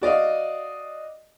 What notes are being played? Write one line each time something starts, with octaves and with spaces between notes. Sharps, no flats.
F#4 D5 D#5 F5